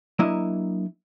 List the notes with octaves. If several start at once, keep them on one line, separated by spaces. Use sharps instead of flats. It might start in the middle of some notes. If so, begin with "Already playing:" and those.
F#3 A#3 D4 E4 D#5